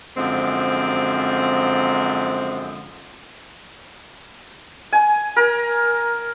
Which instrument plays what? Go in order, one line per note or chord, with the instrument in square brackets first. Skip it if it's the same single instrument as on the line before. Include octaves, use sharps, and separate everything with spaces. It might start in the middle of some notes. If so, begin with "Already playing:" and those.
[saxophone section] F#2 D3 F3 G#3 C4
[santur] G#5
A#4